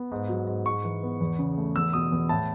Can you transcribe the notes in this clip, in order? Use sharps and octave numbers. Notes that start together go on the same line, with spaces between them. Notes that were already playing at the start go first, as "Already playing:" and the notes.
Already playing: B3
G#2
F#3
G#2
G#2 C#6
E3
B3
E2
C#3
A3
E2 E6
B2 D#6
E2
A2 A5